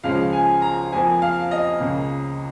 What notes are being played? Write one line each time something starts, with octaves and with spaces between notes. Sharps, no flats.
C#2 C#3 F3 G#3 F5
G#5
A#5
F2 F3 A#3 G#5
F5
D#5
C#2 C#3 A#3